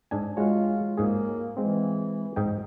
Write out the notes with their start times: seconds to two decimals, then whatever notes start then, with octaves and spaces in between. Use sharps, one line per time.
0.11 G#2 D4 G#5
0.37 G#3 F4 F#4 C#5
0.98 G#2 A#3 G#4
1.57 E3 G#3 C4
2.36 G#2 D#4 G5